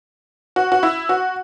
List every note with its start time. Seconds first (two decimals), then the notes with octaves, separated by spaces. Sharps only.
0.56 F#4
0.72 F#4
0.83 E4
1.09 F#4